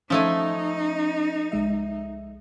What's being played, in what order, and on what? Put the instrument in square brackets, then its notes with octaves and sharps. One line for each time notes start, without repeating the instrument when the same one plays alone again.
[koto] F3 A3 G#5 [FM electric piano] C#4 [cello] D#4
[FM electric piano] C2 G#3 E5